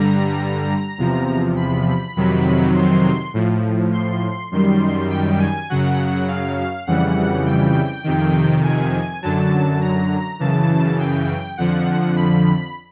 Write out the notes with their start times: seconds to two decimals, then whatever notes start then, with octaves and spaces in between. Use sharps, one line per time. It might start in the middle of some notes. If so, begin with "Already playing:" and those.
Already playing: G2 D3 G3 A#5
0.98 E2 C3 F3
1.57 B5
2.16 F2 C3 D#3 F#3
2.74 C6
3.34 A2 F3
3.92 C6
4.51 F#2 D#3 G3 C6
5.10 G5
5.40 G#5
5.70 F#2 C#3 F#3 F#5
6.28 F5
6.87 F2 C#3 E3 G3 F#5
7.46 G5
8.04 F2 C3 D#3
8.64 G#5
8.93 G#5
9.22 F#2 D3 F#3 A5
9.81 A#5
10.40 F#2 C#3 E3 A5
10.99 G5
11.57 F2 D3 F3 F#5
12.16 B5